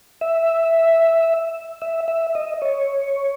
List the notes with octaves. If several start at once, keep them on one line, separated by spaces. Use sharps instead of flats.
E5
E5
E5
D#5
C#5